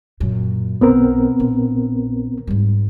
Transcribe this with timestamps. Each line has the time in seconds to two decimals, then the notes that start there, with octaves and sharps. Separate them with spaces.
0.20 F#2 A#2
0.81 B1 B3 C4 A#4
1.40 A#1
2.47 G#2 G3